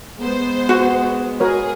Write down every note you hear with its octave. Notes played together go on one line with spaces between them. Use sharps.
G#3 B3 C5
F#4
F#4 G#4 A#4 C#5